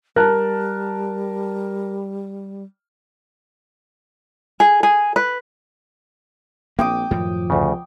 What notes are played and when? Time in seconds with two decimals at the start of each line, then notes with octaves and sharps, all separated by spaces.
0.16 G3 A#4 A5 F#6
4.60 G#4
4.83 G#4
5.16 B4
6.79 A#1 A#3 C4 G5 D6 D#6
7.11 F#2 A2 D#3 F3
7.50 D2 C#3